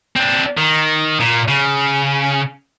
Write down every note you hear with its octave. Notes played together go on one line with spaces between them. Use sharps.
C4 D4
D#3
A#2
C#3